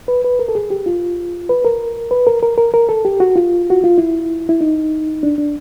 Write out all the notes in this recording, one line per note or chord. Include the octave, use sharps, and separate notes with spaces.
B4
B4
A#4
A4
G#4
G4
F4
B4
A#4
B4
A#4
A#4
A#4
A#4
A4
G4
F#4
F4
F#4
F4
E4
E4
D#4
D4
D4